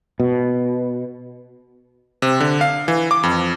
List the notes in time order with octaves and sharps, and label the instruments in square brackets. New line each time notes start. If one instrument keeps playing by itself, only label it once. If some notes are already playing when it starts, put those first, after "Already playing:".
[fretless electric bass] B2
[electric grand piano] C3
D3
F5
E3
D6
F2